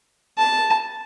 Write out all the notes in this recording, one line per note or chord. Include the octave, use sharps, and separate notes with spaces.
A5